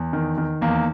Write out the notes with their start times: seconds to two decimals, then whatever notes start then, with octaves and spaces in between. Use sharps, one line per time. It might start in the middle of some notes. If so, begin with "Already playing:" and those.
Already playing: E2
0.13 D#3
0.38 D#3
0.62 E2 A#3